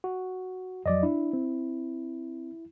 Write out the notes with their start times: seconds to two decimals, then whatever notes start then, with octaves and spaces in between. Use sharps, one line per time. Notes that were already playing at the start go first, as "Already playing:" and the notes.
0.04 F#4
0.86 F2 F#3 D5 D#5
1.03 D4 E4
1.33 C4